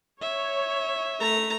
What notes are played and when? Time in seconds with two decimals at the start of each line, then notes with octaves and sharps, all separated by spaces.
0.21 C#5 E5
1.18 A3 A#5